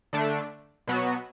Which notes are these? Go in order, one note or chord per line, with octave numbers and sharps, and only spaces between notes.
D3 A3 D4
B2 F#3 B3 F#4